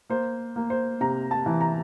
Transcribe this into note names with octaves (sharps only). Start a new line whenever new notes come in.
A#3 C5
A#3
C5
C3 A#5
A5
E3
A#5